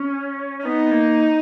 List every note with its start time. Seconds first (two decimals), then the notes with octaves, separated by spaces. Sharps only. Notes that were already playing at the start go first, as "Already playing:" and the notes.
Already playing: C#4
0.59 C#4
0.65 B3 D#4
0.85 B3
0.91 A#3